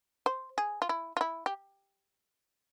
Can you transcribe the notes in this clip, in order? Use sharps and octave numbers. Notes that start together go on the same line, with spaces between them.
C5
G#4
F4
E4
F4
E4
G4